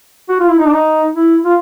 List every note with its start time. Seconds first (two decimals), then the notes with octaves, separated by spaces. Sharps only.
0.29 F#4
0.40 F4
0.49 E4
0.59 D#4
0.66 D4
0.73 D#4
1.16 E4
1.45 F4